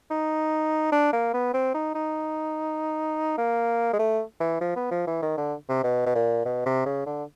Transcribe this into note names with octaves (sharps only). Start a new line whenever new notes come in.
D#4
D4
A#3
B3
C4
D#4
D#4
A#3
G#3
A3
E3
F3
B3
F3
E3
D#3
D3
C3
B2
B2
A#2
B2
C3
C#3
D3